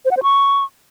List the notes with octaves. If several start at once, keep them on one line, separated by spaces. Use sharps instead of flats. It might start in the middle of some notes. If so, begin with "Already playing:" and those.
C5
F#5
C5
C#6